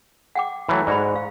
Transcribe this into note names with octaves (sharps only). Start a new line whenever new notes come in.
F#5 G5 D6
E3 F#3 A3
G#2 F#4 D5 F#5 B5
F5